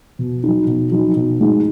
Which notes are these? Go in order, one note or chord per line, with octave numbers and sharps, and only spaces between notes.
B2
F#3 D#4
B2
F#3 D#4
B2
G#3 D#4